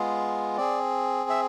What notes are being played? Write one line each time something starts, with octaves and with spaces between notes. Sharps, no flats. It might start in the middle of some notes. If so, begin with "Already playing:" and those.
Already playing: G#3 B3 F4 G#4
C4 G#4 D5
E5